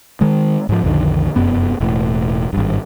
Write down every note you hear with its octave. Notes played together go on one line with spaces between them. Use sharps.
D#3 G#3
G#2 F3
B1 F2 D3 D#3
F1 F#2 B3
E1 A2
G#1 G2